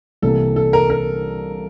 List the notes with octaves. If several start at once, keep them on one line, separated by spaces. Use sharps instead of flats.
C2 C3 E3 A#3 A4
A4
A#4
A#4